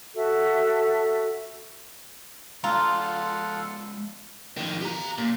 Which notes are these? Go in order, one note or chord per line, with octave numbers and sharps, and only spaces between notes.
F#4 A4 E5
G#3 F4 A4 D5 F5 F#5 A#5
F2 D#3
G4 A#5
A#2